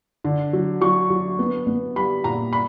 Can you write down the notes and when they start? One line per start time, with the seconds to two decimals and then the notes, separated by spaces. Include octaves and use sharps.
0.24 D3
0.53 F#3
0.81 F#3 C#6
1.10 F#3
1.39 B3
1.67 B3
1.96 G3 B5
2.24 A#2 A#5
2.53 B5